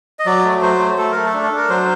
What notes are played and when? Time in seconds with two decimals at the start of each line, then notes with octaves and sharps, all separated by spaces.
0.19 D#5
0.26 F#3 D5
0.45 A3
0.62 F#3 C5
0.79 A3
0.98 A3 A4
1.12 A3 A#4
1.26 A4
1.34 D4
1.43 A4
1.52 D4 A#4
1.69 F#3 C5